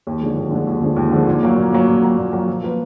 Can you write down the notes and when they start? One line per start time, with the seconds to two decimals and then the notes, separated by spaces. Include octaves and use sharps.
0.07 D#2
0.21 D3 F3 G#3
0.37 D#2
0.51 D3 F3 G#3
0.67 D#2
0.82 D3 F3 G#3
0.96 D#2
1.12 D3 F3 G#3
1.27 A#2
1.43 F#3 A#3
1.57 A#2
1.72 F#3 A#3
1.88 A#2
2.02 F#3 A#3
2.17 A#2
2.33 F#3 A#3
2.47 F3
2.63 A#3 F4 B4